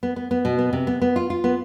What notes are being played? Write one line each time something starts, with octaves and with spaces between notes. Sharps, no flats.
B3
B3
B3
B2
B3
C3
B3
B3
F4
F4
B3